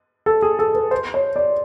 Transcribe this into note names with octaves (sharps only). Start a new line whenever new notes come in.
A4
G#4
A4
B4
C5
C#5
D5